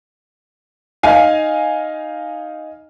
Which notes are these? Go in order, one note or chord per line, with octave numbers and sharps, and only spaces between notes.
D#4 F5 G#5